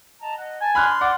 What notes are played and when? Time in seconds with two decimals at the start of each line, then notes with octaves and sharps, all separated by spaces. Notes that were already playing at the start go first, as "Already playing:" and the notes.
0.21 D#5 A5 A#5
0.38 D#5 F#5
0.61 G#5 A5
0.75 D4 B5 C6 F6 F#6
1.01 D5 F#5